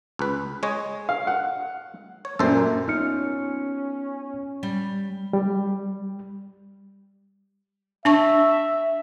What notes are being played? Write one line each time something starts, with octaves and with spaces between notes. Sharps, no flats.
C#2 B4
G#3 C#5 D#5
F5
F#5
C#5
F#2 A#2 A4 C5
B3 C#4 D#4 F4 F6 C#7
G3
G3
D4 E5 A5 C#6